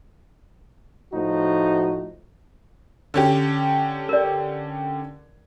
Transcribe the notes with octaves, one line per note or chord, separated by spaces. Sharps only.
A2 F3 D#4 F#4
D3 C#4 G4
A#4 D5